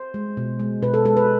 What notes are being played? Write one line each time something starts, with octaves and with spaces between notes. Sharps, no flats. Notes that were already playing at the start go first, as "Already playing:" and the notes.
Already playing: C5
G#3
B2
G#3
B2 B4
A4
G#3 A4
B4